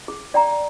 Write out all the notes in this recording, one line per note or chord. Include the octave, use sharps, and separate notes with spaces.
G#4
D5 G5 A#5